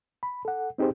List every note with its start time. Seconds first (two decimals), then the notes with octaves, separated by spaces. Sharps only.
0.23 B5
0.45 A4 F#5
0.78 C4 D#4 G4 G#4 C5